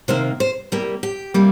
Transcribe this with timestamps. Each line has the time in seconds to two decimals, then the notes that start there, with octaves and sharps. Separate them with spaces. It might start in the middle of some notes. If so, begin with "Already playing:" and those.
0.08 C3 D#3 A#3 C5
0.40 C5
0.72 C3 G3 A#3 G4
1.03 G4
1.34 C3 G3 A#3